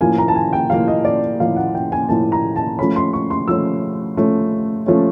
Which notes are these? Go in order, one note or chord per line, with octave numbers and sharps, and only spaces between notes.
A2 F3 A#3 G#5
A#5
A5
G#5
G5
A2 F3 A#3 F5
D#5
D5
A2 F3 A#3 F5
F#5
G5
G#5
A2 F3 A#3 A5
A#5
A5
F3 A3 C#4 B5
C6
C#6
C6
F3 A3 C#4 E6
F3 A3 C#4
F3 A3 C#4